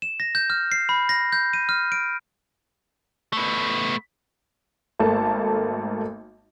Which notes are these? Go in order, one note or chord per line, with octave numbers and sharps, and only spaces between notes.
E7
A#6
G6
F6
C7
B5
A#6
G6
D#7
F6
D7
A3 B3
G#1 A3 A#3 A5